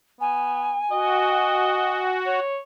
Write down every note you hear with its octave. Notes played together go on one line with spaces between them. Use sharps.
B3 G#5
F#4 D#5
C#5